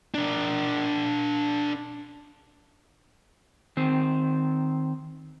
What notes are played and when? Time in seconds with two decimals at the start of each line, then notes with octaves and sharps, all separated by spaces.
0.14 D4 A#4
3.77 D#3 C4